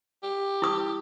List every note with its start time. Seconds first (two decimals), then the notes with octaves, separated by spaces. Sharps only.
0.23 G4
0.62 E4 D#6